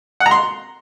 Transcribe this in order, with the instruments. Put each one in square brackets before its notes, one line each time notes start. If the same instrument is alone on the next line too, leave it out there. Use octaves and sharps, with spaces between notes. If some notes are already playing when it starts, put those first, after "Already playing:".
[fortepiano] F#5
A#5
C6